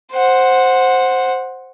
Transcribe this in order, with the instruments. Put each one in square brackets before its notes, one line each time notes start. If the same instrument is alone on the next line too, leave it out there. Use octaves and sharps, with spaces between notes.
[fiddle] C5 F#5